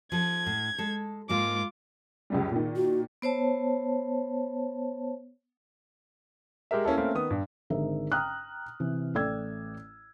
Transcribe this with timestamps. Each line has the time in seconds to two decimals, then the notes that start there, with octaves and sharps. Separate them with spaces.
0.12 F3 A4 G#6
0.46 A2
0.78 G#3 A4
1.29 G#2 G#3 A#3 F4 D6
2.30 C#2 F#2 G3
2.51 A#2 D#3
2.76 F#4
3.22 B3 C5 C#5 A5
6.71 G#3 G4 A#4 E5
6.85 A#3 C#4 E4 A4
6.97 A3 A#3 C4 C#4 A#4
7.15 D#3 B3 D#6
7.31 G2
7.70 G#1 G#2 D3 G#4 A#4 E5
8.12 G5 A#5 D#6 F6 F#6
8.80 C3 E3
9.14 A1 A3 D5 G5 E6 G#6